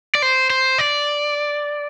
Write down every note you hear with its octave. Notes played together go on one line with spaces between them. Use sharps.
D5
C5
C5
D5